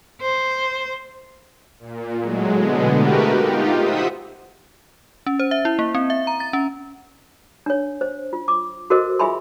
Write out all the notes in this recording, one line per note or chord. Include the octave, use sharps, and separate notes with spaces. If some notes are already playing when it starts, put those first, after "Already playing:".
C5
A#2
A2 F#3 G#3
B2 D3 G#3 B3
A3 F#4 G4 A#4 B4
D#4 F4 G4
C5 E5 F#5 D#6 B6
C#4
C5
E5
E4
A#3
C4
E5
A#5
A6
C#4
D4 C#5
C5
F4
D6
F#4 A4 A#4 C5 D#5
F4 G#4 E5 G#5 B5 C6